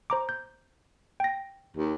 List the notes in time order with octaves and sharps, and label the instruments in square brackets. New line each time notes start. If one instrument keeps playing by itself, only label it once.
[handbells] C5 A#5 D6
G6
G5 A#6
[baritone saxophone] D#2